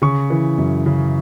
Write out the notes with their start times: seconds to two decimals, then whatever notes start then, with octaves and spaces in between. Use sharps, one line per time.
0.02 C#3 C#6
0.30 E3
0.58 F#2
0.86 C#3